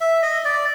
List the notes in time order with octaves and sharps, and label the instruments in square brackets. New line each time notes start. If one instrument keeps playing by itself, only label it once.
[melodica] E5
D#5
D5